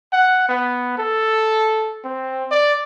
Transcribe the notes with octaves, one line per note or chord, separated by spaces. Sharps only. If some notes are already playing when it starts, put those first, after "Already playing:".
F#5
B3
A4
C4
D5